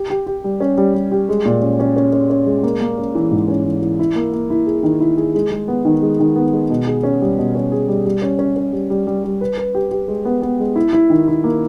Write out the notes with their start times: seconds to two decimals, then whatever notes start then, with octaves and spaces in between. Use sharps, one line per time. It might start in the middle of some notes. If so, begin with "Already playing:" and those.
Already playing: G4
0.10 G4
0.27 G4
0.44 G3
0.60 C#4
0.78 G3
0.94 G3
1.12 G4
1.29 G#3
1.45 A#2
1.62 C#4
1.80 C#4
1.97 C#4
2.13 C#4
2.30 C#4
2.46 G#3
2.63 A#3
2.81 A#3
2.98 C#4
3.15 E3
3.31 G#2
3.48 C#4
3.65 E3
3.82 E3
3.99 E4
4.16 A#3
4.33 A#3
4.50 E4
4.66 G#4
4.83 D#3
5.01 E4
5.17 G#4
5.35 G#3
5.51 G#3
5.68 B3
5.85 D#3
6.02 G#3
6.20 D#3
6.36 B3
6.53 G#3
6.70 B2
6.87 G#4
7.04 C#4
7.21 G3
7.38 B2
7.55 C#4
7.72 G#4
7.88 G3
8.06 G3
8.22 C#4
8.39 C#4
8.56 C#4
8.73 G3
8.90 G3
9.07 G3
9.24 G3
9.41 B4
9.58 B4
9.75 G4
9.91 G4
10.08 G#3
10.25 B3
10.42 B3
10.60 G#3
10.76 E4
10.93 E4
11.10 D#3
11.28 E4
11.44 A#3